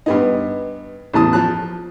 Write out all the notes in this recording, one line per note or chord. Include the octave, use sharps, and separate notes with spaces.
G2 B3 D#4
A1 E2 A5 D#6
F3 A5 F#6